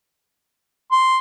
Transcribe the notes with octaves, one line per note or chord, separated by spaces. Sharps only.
C6